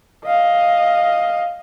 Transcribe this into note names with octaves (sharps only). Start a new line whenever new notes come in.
D#5 F5